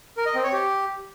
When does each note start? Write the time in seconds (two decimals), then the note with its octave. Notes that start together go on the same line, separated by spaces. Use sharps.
0.17 A#4
0.26 D#5
0.35 C4
0.44 C#5
0.53 G4